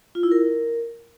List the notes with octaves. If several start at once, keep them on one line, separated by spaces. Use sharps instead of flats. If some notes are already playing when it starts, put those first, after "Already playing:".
F4
E4
A#4